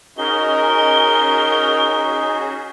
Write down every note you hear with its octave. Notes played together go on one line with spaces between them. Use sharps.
C#4 D#4 F#4 G#4 A#4 D#5 G7